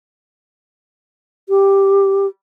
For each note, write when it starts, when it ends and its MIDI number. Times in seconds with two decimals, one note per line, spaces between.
1.49 2.26 67